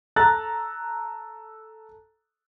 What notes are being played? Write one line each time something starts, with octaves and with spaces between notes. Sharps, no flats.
A4 A#5 F#6 A6